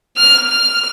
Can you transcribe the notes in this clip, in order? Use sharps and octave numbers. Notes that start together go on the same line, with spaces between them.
F6
F6